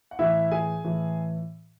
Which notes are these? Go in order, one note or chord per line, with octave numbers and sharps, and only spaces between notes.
F#5
A2 E3 E4 E5
G#4 G#5
A2 E3